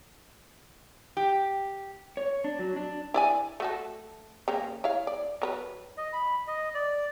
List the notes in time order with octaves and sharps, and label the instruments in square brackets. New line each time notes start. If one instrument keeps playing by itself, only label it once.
[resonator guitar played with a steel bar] G4
[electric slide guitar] C#5
D4
F#3
D4
[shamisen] E4 D5 G#5
A3 F#4 A4
C#3 G3 A#3
E4 C#5 F5
D5
F#3 A#4 B4
[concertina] D#5
B5
D#5
D5